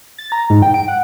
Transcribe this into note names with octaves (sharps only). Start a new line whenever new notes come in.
A6
A#5
G#2
G5
D7
F#5